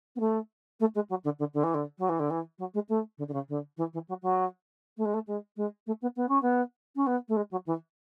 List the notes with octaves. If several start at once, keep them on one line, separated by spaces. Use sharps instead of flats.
B3
A3
A3
G#3
F#3
D3
D3
D3
E3
D3
F#3
E3
D3
E3
F#3
G#3
A3
D3
D3
C#3
D3
E3
E3
F#3
F#3
A3
G#3
A3
G#3
G#3
A3
B3
B3
C#4
B3
C#4
B3
A3
G#3
F#3
E3